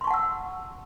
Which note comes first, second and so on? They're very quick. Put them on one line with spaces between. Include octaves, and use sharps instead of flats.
C6 C#6 A5 F#5 E6